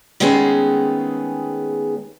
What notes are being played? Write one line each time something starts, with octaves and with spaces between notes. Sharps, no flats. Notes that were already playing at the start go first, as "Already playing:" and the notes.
D#3 G#3 A3 B3 C#4 G#4